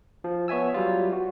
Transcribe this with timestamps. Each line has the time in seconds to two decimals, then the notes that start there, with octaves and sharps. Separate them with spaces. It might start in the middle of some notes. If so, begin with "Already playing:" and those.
0.24 F3
0.48 B3 C#5 E5 G#5 E6
0.74 F#3 G3 F4
1.12 F#4